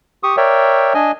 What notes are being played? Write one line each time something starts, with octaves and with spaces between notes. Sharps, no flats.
G4 C#6 D#6
A#4 C#5 D5 E5 G5
D4 D#5 G#5